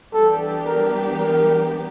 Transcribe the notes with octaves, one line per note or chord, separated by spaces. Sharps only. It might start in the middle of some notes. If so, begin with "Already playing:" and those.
E3 G3 B3 D4 G4 A4
A#4
A#4